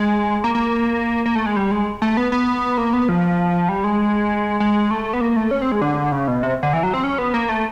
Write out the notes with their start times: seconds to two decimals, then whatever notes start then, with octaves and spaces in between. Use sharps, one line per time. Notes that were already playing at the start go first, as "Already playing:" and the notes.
Already playing: G#3
0.44 A#3
0.55 A#3
1.26 A#3
1.35 A3
1.46 G#3
1.57 G3
1.71 G#3
2.02 A3
2.17 B3
2.32 B3
2.78 A#3
2.93 B3
3.09 F3
3.69 G3
3.84 G#3
4.60 G#3
4.91 A3
5.13 B3
5.21 A#3
5.36 A3
5.51 C#4
5.62 C4
5.72 G#3
5.81 D3
6.12 C#3
6.28 B2
6.43 C3
6.63 D3
6.73 E3
6.83 F#3
6.94 C4
7.04 C#4
7.18 B3
7.34 A#3
7.49 A3